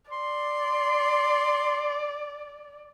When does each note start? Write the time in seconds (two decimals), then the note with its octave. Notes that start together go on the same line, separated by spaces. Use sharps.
0.11 D5 C6